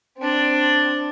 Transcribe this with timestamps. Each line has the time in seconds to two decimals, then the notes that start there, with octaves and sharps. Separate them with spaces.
0.18 C4 D4